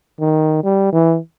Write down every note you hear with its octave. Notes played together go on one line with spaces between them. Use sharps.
D#3
G3
E3